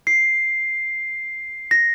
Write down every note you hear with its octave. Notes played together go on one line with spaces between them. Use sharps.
C7
A#6